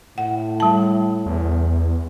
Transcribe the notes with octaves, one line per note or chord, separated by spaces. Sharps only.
A2 F#5
G3 A5
E2